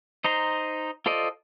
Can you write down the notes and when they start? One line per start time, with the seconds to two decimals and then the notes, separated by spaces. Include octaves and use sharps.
0.24 D#4 C5 A#5 C6
1.06 F4 A4 C5 D5 D#5